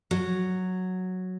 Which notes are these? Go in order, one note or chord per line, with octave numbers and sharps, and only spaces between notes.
F#3